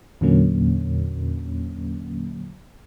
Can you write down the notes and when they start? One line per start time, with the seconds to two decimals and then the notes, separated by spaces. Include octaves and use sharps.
0.21 E2 A#2 D3 F#3 A#3 C#4